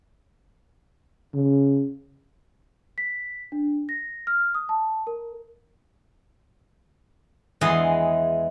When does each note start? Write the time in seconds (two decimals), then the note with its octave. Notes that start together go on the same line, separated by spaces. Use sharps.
1.34 C#3
2.98 B6
3.52 D4
3.89 A#6
4.27 F6
4.55 D#6
4.69 A5
5.07 A#4
7.61 E2 E3 G#3 D5 D#5 C6